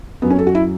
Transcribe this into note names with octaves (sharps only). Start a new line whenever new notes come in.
F#2 F#3 B3
C#4
A4
F#4
E4